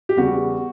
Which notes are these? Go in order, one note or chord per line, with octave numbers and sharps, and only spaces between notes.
G4
E2 C#3 G3 B3 F#4